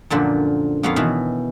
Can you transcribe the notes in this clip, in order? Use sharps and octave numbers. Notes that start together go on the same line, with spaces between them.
F#2 A#2 D3 F3
F2 A#3 B3 F4 C#5 F5
B2 D#3 E3